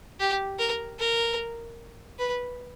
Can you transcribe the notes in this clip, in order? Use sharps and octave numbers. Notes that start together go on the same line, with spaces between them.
G4
A#4
A#4
B4